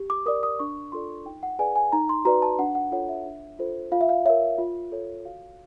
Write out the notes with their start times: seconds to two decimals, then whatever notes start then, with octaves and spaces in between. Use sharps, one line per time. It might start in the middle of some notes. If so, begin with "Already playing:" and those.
Already playing: G4
0.10 D6
0.26 A#4 D5 D#6
0.43 D#6
0.59 D4 C#6
0.92 F4 A4 D5 C6
1.25 D#4 G5
1.43 F#5
1.59 G#4 B4 D5 G#5
1.76 G#5
1.92 D#4 A#5
2.09 C6
2.25 F#4 B4 D5 A#5
2.42 A5
2.59 D4 F#5
2.75 F#5
2.92 F4 A4 C#5 F#5
3.09 E5
3.26 D4
3.59 F4 A4 C5
3.92 F4 F5
4.01 E5
4.09 F5
4.25 A#4 C#5 E5
4.58 F4
4.92 A4 C#5
5.25 F#4 F5